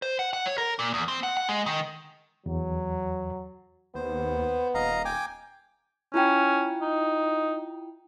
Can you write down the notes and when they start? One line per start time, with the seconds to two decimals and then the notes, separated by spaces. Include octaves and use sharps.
0.02 C5
0.19 F#5
0.33 F#5
0.46 C#5
0.58 A#4
0.79 A#2
0.94 E2
1.08 C4
1.23 F#5
1.37 F#5
1.49 G#3
1.66 D#3
2.46 E2 F#3
3.95 D#2 B3 C5
4.74 D#1 D#5 F5 A#5
5.05 G5 G#5 D6
6.14 C#4 E4 F4 G5
6.81 D#4